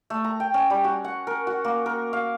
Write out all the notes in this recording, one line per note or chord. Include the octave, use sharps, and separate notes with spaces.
A3
A#5
G5
C#4
G3
F#4
F#5
A#4
F#4
A#3
A#4
F5